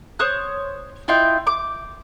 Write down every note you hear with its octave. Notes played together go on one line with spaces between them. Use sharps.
C5 C#5 D#6 F#6
E4 F4 D#5 G5
D6